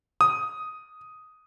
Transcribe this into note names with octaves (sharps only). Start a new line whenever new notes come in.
D#6